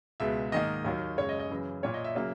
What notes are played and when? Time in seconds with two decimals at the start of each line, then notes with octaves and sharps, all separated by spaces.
0.20 C#2 B2 G#3 E5
0.52 G#2 D#3 A#3 D#5
0.85 D#2 D#3 F#3 A#3
1.18 F#2 C#3 G#3 C#5
1.29 D#5
1.39 D#5
1.50 F#2 C#3 E3
1.83 A#2 A#3 C#5
1.94 D#5
2.04 E5
2.15 C#3 F#3 A#3